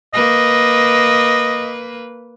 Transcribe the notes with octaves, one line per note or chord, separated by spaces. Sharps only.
A#3 B4 D#5